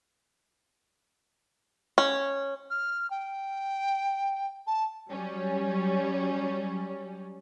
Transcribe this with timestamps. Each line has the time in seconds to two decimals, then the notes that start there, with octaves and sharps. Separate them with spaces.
1.98 C#4
2.70 F6
3.11 G5
4.67 A5
5.11 F#3 G3 C#4